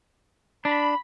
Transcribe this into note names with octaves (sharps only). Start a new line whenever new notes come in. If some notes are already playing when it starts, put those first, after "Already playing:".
D4 B5